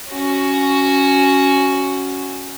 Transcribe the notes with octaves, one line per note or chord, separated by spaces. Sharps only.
C#4 F#4